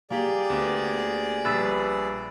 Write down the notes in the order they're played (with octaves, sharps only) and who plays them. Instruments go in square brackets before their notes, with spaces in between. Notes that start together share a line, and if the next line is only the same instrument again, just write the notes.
[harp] A#3 G4 [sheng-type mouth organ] G#4 D5
[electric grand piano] D2 B3
[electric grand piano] A#1 G3 [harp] B4 E6 A6